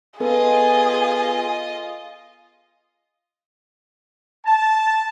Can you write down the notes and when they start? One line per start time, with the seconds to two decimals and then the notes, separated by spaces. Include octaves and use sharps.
0.20 B3 F4 G#4 A4 B4 D#5
4.44 A5